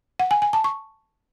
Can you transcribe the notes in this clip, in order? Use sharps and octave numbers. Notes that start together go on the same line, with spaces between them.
F#5
G#5
G#5
A5
C#6